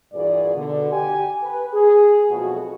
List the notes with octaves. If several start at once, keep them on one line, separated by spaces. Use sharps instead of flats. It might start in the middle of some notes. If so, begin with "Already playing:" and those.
G2 A#2 E3 F#4 G#4 D5
B2 D3
G4 G#5
B4
G#4
B1 F2 B2 A3 F#4